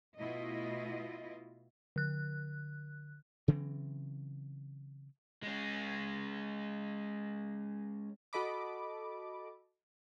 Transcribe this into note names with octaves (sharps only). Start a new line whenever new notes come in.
B2 A3 E4 F4 D#5
D3 F#6
C#3 E3 F#3 C4
G#3 C#4
F#4 A4 D#5 B5 D6